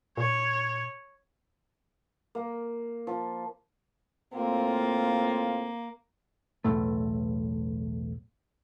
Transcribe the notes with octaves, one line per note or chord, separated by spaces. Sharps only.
A#2 C#5
A#3
F3
A2 A#3 C4 F4
B1 E2 A2 A3